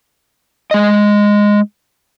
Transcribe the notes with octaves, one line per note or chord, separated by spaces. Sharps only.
G#3 D#5